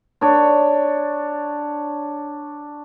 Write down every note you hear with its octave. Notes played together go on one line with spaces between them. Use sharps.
D4 C#5